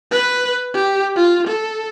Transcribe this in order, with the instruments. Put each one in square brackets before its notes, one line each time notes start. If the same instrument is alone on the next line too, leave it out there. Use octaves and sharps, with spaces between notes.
[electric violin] B4
G4
F4
A4